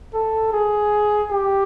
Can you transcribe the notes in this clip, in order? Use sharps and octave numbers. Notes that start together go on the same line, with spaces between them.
A4
G#4
G4